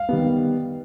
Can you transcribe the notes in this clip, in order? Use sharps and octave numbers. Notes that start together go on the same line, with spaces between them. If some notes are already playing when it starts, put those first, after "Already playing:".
Already playing: F5
D#3 G3 B3